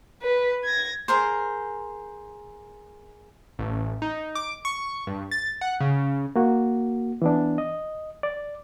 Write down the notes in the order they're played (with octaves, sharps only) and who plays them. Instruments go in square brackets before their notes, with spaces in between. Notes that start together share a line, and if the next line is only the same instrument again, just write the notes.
[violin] B4
G#6 A#6
[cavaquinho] G#4 A#4 C5
[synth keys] A1
D#4
D6
C#6
G2
A6
F#5
C#3
[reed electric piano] A#3 F#4
E3 B3 D4
D#5
D5